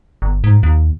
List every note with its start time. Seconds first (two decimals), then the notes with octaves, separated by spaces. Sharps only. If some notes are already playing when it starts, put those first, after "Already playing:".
0.22 G1
0.44 G#2
0.63 D#2